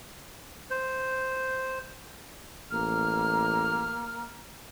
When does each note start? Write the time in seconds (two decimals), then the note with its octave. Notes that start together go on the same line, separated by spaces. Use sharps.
0.70 C5
2.71 A1 A#3 F6